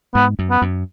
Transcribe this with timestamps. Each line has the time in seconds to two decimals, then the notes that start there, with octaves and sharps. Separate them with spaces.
0.14 G#2 B3
0.39 F#2
0.50 B3
0.62 F#2